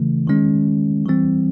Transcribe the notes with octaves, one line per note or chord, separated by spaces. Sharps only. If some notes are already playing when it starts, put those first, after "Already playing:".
Already playing: C#3 E3 A3
D#3 G#3 C#4
E3 G3 C4